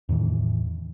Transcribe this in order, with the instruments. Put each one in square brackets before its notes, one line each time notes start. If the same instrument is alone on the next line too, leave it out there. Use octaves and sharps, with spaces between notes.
[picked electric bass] E2 A2 D#3 E3